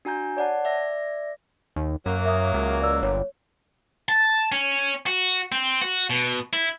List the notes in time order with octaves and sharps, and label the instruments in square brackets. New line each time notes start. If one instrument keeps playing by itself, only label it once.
[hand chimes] D4 F#4 G#5 A#5 G6
C#5 D5 F#5 A5
D5 E5 A#6
[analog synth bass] D#2
[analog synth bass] F#2 [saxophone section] F#3 A#3
[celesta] E5 D#6
[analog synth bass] C#2
[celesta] D5 E6
[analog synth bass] G1 [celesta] C#5
[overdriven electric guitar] A5
C#4
F#4
C4
F#4
B2
E4